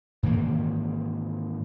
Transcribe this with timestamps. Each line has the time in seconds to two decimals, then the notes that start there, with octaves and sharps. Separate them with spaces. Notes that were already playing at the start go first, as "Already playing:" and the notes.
0.23 G#2 D#3 E3 A#3